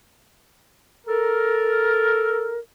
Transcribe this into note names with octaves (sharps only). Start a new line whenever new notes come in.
A4 A#4